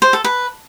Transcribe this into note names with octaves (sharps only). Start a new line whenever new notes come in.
C5
A4
B4